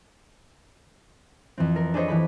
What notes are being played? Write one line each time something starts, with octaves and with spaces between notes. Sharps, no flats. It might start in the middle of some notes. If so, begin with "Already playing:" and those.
F2 E3 C4
A#4
D4 G#4 A4 C5 C#5 D#5
E3 G4 B5